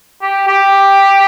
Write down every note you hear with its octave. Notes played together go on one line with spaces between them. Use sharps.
G4
G4